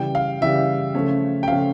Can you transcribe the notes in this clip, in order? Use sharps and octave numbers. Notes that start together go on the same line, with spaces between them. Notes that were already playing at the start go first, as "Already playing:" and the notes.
Already playing: C#3 E3 G3 G5
F5
C#3 E3 G3 E5
C#3 F3 A3 C#4
G5
C#3 F3 A3 C#4 F5